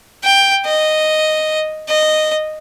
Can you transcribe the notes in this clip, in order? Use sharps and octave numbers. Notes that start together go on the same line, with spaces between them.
G5
D#5
D#5